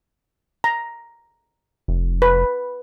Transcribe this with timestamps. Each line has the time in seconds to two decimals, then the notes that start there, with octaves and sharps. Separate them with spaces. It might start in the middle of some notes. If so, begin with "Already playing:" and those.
0.64 A#5
1.88 F1
2.22 B4